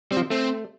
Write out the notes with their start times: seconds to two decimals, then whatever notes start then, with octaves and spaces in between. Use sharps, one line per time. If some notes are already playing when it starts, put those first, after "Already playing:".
0.11 G3 C4
0.17 F3
0.30 A3 C4